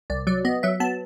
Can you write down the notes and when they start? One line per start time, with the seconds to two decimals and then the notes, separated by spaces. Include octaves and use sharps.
0.10 C2 D5
0.27 F#3 D5
0.45 B3 D#5
0.63 F#3 E5
0.80 B3 A5